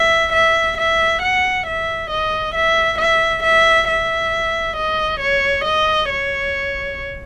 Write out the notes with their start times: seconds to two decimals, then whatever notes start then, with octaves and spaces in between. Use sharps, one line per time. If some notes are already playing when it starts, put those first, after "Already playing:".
Already playing: E5
0.33 E5
0.78 E5
1.22 F#5
1.67 E5
2.11 D#5
2.55 E5
2.99 E5
3.43 E5
3.89 E5
4.77 D#5
5.20 C#5
5.65 D#5
6.10 C#5